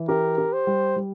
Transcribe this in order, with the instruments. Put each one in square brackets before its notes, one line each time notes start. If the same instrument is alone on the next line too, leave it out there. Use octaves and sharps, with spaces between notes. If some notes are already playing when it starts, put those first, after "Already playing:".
Already playing: [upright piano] E3
[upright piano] G4 [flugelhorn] A#4
[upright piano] G4
[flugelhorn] C5
[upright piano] G3
G3